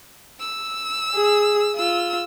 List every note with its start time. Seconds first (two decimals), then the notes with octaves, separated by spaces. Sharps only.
0.40 E6
1.15 G#4
1.76 F4 E6